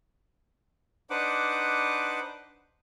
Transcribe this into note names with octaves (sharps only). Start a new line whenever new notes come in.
D4 D#4 B4 C5 F#5 D6